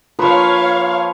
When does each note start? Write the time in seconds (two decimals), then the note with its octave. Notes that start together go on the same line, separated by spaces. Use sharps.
0.19 F3 A#3 B4 C#5 F5